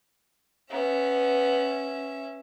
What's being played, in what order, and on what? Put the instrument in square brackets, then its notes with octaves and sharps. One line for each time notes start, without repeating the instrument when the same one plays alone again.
[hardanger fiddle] B3 [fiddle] C#4 E5